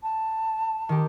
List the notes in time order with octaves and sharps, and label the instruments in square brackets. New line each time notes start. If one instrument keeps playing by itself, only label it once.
[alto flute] A5
[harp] D#3 G4